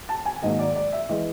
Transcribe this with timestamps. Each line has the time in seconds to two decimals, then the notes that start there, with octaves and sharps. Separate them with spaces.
0.09 A5
0.25 G#5
0.42 G#2 D#3 F#3 A#3 D#5
0.59 D5
0.76 D5
0.92 E5
1.09 E3 G#3 D#5